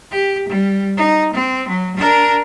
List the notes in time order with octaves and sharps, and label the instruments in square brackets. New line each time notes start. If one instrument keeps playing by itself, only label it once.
[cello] G4
G3
D#4
C4
F#3
D4 A#4